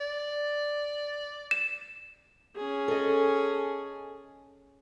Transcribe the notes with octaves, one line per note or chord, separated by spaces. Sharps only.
D5
E7
C#4 G#4
A4 D#5